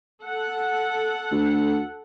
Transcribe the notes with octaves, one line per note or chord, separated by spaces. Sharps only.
A4 F#5
D2